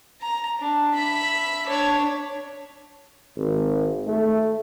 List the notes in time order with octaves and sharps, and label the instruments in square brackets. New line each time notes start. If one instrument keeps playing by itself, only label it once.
[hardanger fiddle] A#5
D4
E5 B5
D4 C#5
[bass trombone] G#1
A3